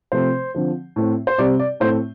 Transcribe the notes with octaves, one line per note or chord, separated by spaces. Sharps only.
C3 F3 A3 C4 C5
D3 F3 C4
A2 A3 C4
C5
C3 G3 C4 D5
D5
A2 A3 C4 C5